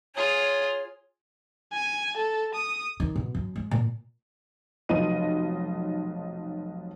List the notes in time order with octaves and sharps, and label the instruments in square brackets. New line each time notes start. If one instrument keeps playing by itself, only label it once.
[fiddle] F4 G#4 [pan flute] C#5
[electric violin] G#5
A4
D#6
[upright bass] D#3
B2
F#2
G#3
A#2
[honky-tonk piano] F1 B1 F4 D#5 D#7